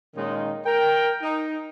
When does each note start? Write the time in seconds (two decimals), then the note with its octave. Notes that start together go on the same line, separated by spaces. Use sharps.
0.16 A#2 D#3 G#3 C#4 D#4 F4
0.66 A#4 G5
1.21 D#4